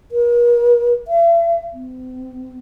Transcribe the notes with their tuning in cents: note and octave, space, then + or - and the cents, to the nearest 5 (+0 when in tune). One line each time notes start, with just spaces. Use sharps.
A#4 +45
E5 +45
C4 -40